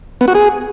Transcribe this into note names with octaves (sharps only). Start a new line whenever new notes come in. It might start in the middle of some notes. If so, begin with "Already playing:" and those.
B3
F#4
G#4